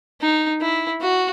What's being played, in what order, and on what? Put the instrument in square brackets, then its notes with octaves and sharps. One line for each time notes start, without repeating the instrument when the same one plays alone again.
[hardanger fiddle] D#4
E4
F#4